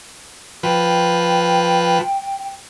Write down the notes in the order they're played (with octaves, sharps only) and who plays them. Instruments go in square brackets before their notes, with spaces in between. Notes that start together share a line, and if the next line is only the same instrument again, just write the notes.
[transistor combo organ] F3 B4 [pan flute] G5